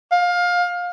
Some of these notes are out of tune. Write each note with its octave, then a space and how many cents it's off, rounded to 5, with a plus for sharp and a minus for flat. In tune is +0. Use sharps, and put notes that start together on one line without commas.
F5 +25